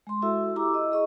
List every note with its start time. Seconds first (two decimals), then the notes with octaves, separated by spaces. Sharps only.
0.07 G#3 C6
0.22 E4 F#4 A4 E5 E6
0.56 E4 G4 A#5 D6 E6
0.74 D#5
0.92 G#4 D#5 C#6